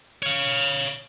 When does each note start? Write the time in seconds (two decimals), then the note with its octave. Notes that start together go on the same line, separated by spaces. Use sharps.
0.23 C#5 F5